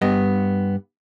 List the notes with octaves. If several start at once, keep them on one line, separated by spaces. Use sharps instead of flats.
G2 B3 D#5